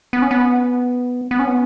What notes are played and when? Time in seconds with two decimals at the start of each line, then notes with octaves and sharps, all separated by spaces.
0.13 B3
0.22 C#4
0.31 B3
1.31 B3
1.39 C#4
1.47 B3